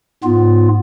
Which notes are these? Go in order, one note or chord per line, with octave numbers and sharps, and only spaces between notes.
G#2 B3 F4